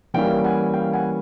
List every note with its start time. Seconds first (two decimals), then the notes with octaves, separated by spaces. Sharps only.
0.14 E3 G3 A#3 C#4 E4 F5 G5
0.44 F#5 G#5
0.73 F5 G5
0.93 F#5 G#5